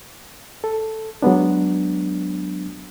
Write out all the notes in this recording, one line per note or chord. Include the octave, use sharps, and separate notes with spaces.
A4
F#3 G#3 B3 D4